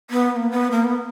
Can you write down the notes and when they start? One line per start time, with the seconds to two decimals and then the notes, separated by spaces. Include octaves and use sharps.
0.10 B3
0.32 B3
0.36 A#3
0.51 B3
0.71 A#3
0.84 B3